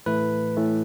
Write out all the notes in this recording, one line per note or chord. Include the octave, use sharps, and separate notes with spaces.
A2 E3 A3 B4
A2 E3 A3